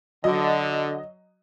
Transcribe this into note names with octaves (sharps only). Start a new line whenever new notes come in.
D3 F#3 D#5